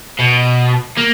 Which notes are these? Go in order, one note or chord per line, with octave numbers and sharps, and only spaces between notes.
B2
A#3